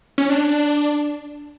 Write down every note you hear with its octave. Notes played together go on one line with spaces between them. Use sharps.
C#4
D4